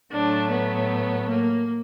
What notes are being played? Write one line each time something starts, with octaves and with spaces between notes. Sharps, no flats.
A2 F#3 A3 D4
B3
A#3